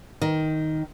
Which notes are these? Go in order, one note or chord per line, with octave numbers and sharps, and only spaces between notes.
D#3